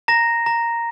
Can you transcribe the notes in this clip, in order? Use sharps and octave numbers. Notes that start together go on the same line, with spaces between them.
A#5 A#6
A#5